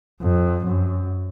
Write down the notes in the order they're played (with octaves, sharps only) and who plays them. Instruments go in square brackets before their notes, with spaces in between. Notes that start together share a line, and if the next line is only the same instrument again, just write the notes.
[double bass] F2
F#2